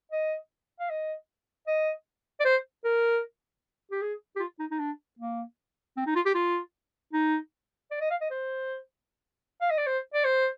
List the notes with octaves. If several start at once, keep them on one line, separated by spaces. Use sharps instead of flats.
D#5
F5
D#5
D#5
D5
C5
A#4
G4
G#4
G4
F4
D#4
D#4
D4
A#3
C4
D#4
F4
G4
F4
D#4
D5
D#5
F5
D#5
C5
F5
D#5
D5
C5
D5
C5